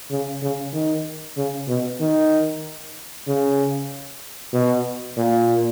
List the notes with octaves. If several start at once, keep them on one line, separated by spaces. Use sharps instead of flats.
C#3
C#3
D#3
C#3
B2
D#3
C#3
B2
A#2